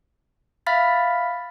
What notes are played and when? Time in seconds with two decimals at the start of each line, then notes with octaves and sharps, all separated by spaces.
0.66 E5 F5 B5 F6 A6 B6